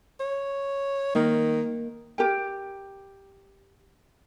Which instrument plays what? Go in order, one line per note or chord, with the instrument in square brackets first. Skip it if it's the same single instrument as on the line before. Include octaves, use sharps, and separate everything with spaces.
[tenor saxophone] C#5
[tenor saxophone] D#3 [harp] A#3
[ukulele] G4 A#4 G5